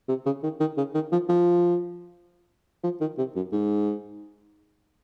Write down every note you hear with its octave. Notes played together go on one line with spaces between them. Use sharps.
C3
C#3
D#3
D#3
C#3
D#3
F3
F3
F3
D#3
C3
F#2
G#2